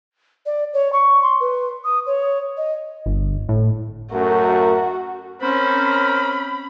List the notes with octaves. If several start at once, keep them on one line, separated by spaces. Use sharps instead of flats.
D5
C#5
C#6
C6
B4
D#6
C#5
D#5
G1
A2
F#2 A3 F#4 A#4
C4 C#4 A#4 C5 B5